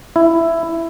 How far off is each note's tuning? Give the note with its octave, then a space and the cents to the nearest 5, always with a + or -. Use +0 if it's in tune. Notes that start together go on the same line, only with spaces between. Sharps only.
E4 +10